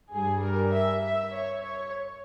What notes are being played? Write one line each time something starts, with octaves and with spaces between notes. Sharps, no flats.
G2 G3 G#4
A#4
E5
E5
C#5
C#5